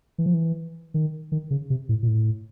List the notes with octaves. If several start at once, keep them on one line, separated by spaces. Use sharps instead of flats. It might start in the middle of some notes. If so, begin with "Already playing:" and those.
E3
F3
E3
D#3
D#3
C#3
C3
A2
A#2
A2